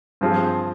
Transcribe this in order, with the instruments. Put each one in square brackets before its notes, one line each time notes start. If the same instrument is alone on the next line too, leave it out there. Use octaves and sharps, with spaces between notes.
[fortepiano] G2 F3 C4 F4 G#4